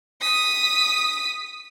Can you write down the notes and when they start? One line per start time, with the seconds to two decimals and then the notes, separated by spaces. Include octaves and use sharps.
0.21 D#6 B6